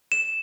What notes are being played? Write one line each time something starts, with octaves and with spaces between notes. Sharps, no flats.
E7